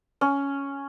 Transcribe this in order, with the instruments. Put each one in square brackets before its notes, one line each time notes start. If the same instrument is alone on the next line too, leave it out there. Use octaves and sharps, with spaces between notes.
[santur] C#4